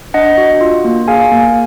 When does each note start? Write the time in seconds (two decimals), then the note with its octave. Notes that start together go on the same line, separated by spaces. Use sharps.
0.14 D4 D#5 F#5
0.37 F#4
0.61 F4
0.85 A#3
1.08 G#4 F5 G#5
1.31 A#3